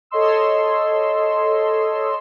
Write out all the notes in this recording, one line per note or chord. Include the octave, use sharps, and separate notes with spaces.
A4 C#5 D#5 C6 E6